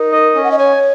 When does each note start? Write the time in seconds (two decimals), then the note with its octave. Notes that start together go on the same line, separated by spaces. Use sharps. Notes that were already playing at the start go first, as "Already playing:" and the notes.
Already playing: D#4 A#4
0.12 D#5
0.35 C#4
0.43 F#5
0.51 D#5
0.59 C#5 G#5